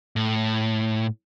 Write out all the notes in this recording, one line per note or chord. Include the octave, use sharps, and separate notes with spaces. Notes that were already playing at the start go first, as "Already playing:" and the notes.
A2